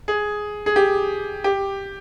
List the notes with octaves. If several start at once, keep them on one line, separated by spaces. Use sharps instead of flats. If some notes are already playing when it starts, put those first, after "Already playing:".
G#4
G#4
G4
G4